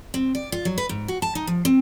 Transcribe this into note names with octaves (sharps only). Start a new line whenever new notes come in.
C4
D5
F4
F#3
B4
G#2
F#4
A5
D#4
F3
C4